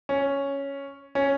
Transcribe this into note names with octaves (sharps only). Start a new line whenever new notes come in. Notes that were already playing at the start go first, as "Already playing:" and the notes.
C#4
C#4